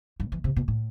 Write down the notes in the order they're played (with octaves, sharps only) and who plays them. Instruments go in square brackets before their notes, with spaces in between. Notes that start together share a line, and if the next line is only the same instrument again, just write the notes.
[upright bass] G2
E3
C3
B2
A2